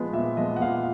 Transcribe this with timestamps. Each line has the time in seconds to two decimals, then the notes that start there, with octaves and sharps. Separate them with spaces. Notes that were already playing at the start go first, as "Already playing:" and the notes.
Already playing: F3 G#3 B3
0.13 A#2 E5
0.37 F3 G#3 B3 D#5
0.56 F#5
0.61 A#2 F5